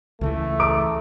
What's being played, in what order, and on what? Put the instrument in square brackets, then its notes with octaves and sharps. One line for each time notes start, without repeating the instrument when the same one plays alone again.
[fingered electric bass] C#2 C#3 E3 [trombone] A3
[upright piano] A#5 D6 D7